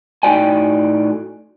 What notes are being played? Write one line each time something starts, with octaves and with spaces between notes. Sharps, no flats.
A2 D#4 F#4 D5 G5 G#5